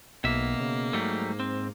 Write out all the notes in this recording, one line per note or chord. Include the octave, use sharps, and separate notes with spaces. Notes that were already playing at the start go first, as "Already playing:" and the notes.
B1 B2 A#3 E5
C#3
G#2 F#3 G3 A3
C4